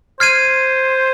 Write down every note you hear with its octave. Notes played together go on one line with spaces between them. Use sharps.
C5 F6 G#6 C7 D#7